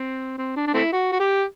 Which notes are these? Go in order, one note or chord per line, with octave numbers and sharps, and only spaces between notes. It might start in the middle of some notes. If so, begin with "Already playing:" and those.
Already playing: C4
C4
D4
D4
A3 C4 E4
F#4
F#4
G4